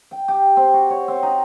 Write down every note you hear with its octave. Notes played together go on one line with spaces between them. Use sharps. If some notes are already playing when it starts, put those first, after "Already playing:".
G5
G4
C4
F#4
C#5
C4
D#4